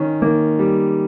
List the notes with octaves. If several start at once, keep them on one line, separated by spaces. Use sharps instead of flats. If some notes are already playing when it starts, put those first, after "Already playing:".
Already playing: D#3 C#4
D#3 A#3
G3